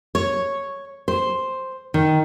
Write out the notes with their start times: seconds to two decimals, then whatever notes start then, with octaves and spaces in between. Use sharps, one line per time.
0.15 C#5
1.08 C5
1.94 D#3